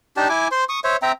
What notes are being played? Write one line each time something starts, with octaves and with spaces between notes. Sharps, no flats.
D4 D#4 G4 A5
E4 G#5 D6
C5 C6
C#6 D#6
C5 C#5 E5
C4 E5 G5 A#5